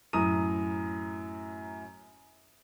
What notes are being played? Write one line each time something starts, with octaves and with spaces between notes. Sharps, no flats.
F#2 A2 A#5 D#6 D#7